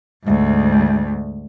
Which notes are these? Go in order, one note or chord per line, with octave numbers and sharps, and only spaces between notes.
D2 G#2